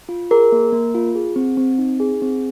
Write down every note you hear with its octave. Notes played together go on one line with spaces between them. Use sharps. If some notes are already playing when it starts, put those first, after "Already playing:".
F4
G#4 A#4
A#3
A#3
F4
G#4
C4
C4
D#4
G#4
C4